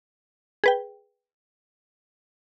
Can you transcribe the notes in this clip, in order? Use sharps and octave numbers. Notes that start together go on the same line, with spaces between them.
G#4 B4 G5